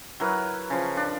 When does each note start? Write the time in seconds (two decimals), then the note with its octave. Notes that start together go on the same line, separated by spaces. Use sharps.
0.20 F#3 E4 A#4 B4
0.70 C#3 F3
0.97 D4